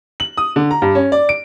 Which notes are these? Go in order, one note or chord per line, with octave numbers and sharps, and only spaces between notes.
F#7
D#6
D3
A#5
G2
C#4
D5
D7